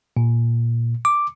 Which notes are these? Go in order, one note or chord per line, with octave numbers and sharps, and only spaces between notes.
A#2
D6